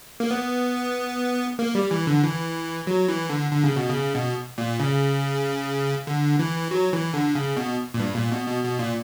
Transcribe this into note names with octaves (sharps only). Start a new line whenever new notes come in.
A#3
B3
A#3
G3
E3
D3
E3
F#3
E3
D3
D3
C#3
B2
C#3
B2
A#2
C#3
D3
E3
F#3
E3
D3
C#3
B2
A#2
G2
A#2
B2
B2
B2
A#2